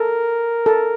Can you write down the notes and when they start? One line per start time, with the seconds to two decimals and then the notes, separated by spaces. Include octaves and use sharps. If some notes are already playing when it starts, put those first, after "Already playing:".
Already playing: A4 A#4
0.66 A4